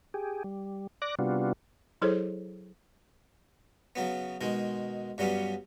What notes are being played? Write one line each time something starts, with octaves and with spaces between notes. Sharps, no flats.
G4 G#4
G3
D5 D6 F#6 A#6
C3 G3 B3 D4 F4 F#4
F#3 E4 G#4 A4 C5 C#5
C#3 F#3 B3
B2 D#3 G#3
G2 F#3 G3 B3 C#4